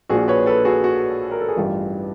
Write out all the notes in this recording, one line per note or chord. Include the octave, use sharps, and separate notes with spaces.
A#1 A#2 F3 F#4 G#4
B4 C#5
A4 B4
F#4 G#4
F#4
A#4
A4
G#4
A1 G2 E3 F4 G4